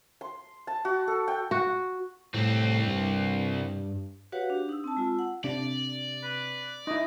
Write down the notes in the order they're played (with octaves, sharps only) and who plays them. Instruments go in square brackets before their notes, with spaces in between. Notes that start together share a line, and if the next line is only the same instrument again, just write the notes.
[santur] C6
A5
F#4
A4
G5
[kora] F#4
[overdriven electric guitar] C2 C4 [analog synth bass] A2
[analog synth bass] G2
[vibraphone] F#4 G4 B4 C#5 F5 F#5
D4 G4
D#4 E6
C4 A5
G#3 F4 E6
F#5
[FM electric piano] C3 [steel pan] D4 [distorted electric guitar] D5
[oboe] B4
[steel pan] D#4 E4 [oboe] D#5